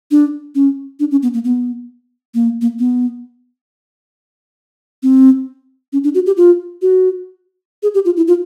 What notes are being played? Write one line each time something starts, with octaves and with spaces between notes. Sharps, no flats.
D4
C#4
D4
C#4
B3
A#3
B3
A#3
A#3
B3
C4
C#4
D4
F#4
G4
F4
F#4
G#4
G4
F4
E4
F4